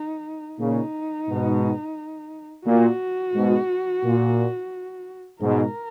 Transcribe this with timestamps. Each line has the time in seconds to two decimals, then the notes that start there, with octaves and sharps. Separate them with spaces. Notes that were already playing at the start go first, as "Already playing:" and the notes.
Already playing: D#4
0.59 A#2 C#3 D#4
1.28 G#2 B2
2.66 A#2 F#4
3.34 G#2 B2
4.04 A#2
5.41 G#2 B2 A#4